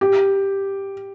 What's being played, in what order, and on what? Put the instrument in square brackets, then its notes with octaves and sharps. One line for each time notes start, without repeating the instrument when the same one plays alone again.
[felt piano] G4